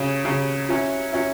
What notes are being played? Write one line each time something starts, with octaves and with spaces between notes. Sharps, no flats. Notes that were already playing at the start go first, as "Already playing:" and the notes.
Already playing: C#3 F#3 C#4
C#3 F#3 C#4
F#3 C#4 E4
F#3 C#4 E4